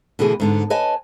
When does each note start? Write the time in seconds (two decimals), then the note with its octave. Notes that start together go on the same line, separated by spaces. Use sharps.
0.19 B2 D3 E3 A3 G#4
0.40 G#2 D3 B3
0.70 B4 C#5 D#5 G#5 A5